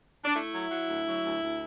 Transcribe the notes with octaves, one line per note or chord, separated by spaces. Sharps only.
D4
A3 E4
F#3
F#3
D2
F#3
D2
D2